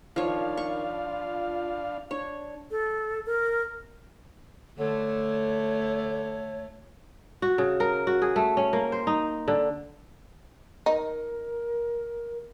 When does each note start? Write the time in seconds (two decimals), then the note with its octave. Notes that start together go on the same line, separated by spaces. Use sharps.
0.16 D#3 F3 D4 C#5 F5
0.57 C#6
1.06 F4
2.11 D4 C#5
2.71 A4
3.26 A#4
4.78 D3 A3 C#5
7.42 F#4
7.58 C#3
7.80 A#4
8.07 F#4
8.22 G#4
8.36 A3
8.57 C#4
8.73 A#3
8.92 C5
9.07 D#4
9.48 D3
10.86 D#4 A#4